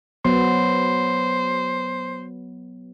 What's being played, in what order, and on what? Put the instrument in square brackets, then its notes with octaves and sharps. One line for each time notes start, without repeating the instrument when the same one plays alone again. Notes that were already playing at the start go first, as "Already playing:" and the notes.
[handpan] F#3 B3 [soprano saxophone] C5